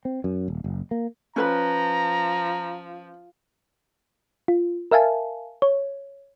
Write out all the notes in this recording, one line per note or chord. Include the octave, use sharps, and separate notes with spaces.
C4
F#2
D#1
F#1
A#3
F3 C#4 B4 A#5 B5
F4
A#4 E5 F5 G#5 A5
C#5